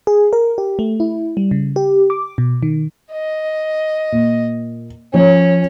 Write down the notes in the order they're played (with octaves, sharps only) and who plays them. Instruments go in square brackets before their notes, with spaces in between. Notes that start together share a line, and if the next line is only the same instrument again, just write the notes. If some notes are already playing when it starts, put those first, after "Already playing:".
[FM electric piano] G#4
A#4
G4
A3
E4
G3
C#3
G4
D6
B2
D#3
[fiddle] D#5
[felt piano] A#2
[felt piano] F3 C#5 [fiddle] C#4